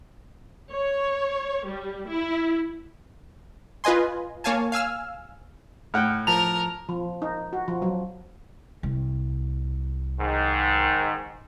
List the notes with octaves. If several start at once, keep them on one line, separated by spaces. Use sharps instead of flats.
C#5
G3
E4
F4 B4 D#5 G#5 C6
A#3 C#5 F5 G#5 A5
F5 G#5 E6 F6
A2 F#5 G5 F6 G6
F3 A#4 A5 A#5 F7
F3
D#4
F#4
F3
F#3
C2
G#2 D#3